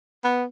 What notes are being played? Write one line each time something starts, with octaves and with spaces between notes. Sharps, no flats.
B3